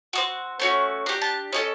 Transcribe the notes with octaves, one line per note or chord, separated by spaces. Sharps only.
C4 D#4 F#4
A3 C#4 F#4
D4 G4 A#5
A5
C#4 E4 A4 D#5